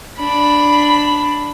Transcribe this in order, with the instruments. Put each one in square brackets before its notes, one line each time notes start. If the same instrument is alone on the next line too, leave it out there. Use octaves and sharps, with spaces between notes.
[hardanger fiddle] D4 B5